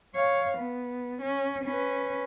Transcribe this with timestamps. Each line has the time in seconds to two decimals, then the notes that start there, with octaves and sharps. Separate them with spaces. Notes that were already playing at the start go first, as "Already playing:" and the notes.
0.15 C#5 F5
0.58 B3
1.22 C#4
1.64 C#4 B4